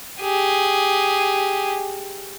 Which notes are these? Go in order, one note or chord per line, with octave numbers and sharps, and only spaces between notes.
G4 G#4